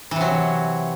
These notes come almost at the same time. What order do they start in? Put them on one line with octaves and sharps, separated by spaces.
E3 C3 F#3